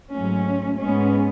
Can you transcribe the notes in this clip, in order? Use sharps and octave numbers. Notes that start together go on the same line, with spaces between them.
G#2 F#3 A3 C#4
G#2 G#3 B3 C#4